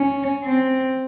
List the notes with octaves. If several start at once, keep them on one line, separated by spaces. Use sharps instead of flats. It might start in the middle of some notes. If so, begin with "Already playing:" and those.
Already playing: C#4
C4